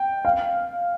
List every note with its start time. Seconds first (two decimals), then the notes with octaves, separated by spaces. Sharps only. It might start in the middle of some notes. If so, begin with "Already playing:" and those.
Already playing: G5
0.25 F5